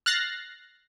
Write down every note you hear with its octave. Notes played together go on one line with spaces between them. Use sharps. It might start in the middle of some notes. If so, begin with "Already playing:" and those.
F6 F#6 A6 A#6 C7